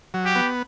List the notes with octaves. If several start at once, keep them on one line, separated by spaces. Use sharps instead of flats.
F#3
G4
B3